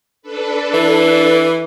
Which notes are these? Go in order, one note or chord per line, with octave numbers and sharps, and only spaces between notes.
D4 A4 B4
E3